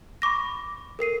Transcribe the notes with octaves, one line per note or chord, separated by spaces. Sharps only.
B5 C#6 D6 A#6
A4 A#4 C7 D#7